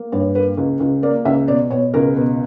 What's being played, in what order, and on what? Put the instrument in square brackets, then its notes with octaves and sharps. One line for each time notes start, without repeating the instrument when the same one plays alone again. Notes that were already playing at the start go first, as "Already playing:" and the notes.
Already playing: [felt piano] A#3
G2 C#5
A#3 B4
C#2
C#2
A#3 D5
C#2 E5
B2 D5
B2 C#5
C#2 A#4
B2